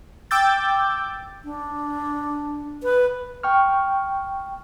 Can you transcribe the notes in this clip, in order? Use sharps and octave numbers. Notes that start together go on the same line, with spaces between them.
G5 D6 E6 G6 A6
D4
B4
G5 C#6 F6